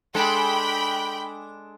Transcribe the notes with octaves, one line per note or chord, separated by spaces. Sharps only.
G#3 D4 A4 G5 B5